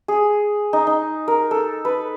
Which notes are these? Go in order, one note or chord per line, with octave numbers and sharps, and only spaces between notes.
G#4
D#4
D#4
A#4
A4
B4